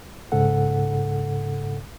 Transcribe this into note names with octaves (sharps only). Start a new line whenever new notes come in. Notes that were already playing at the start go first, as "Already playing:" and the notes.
C2 G#2 C#3 A4 F#5